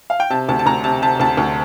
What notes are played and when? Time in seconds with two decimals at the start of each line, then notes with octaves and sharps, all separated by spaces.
0.10 F5
0.20 G5
0.30 C3 A5
0.49 D2 A5
0.59 A5
0.66 D2 A#5
0.84 C3 A5
1.02 C3 A5
1.20 D2 A5
1.37 D2